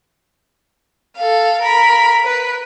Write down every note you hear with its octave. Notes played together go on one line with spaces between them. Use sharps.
A4 F5
A#4 B5
B4